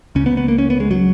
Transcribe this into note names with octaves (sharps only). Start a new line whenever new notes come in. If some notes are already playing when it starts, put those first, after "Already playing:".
C#2 C#3 C#4
B3
B3
A#3
C#4
B3
G#3
F#3